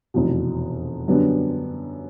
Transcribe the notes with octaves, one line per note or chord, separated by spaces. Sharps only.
F1 E2 B2
F#2 D3 G3 B3 D4